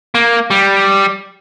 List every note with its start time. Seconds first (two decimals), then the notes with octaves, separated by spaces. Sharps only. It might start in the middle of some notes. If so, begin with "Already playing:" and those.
0.15 A#3
0.50 G3